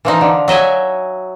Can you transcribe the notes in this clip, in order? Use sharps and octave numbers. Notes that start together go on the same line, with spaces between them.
E3 F3 D#4
D3
F#3 D#5 E5 G#5